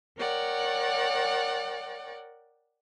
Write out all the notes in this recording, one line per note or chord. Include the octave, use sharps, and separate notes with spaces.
A#4 C#5 D5 F#5 G5